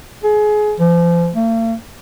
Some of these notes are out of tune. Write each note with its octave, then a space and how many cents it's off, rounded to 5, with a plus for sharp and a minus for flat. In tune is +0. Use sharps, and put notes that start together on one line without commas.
G#4 +25
F3 -35
A#3 -45